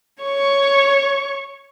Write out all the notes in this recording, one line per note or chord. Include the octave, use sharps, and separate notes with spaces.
C#5 C#6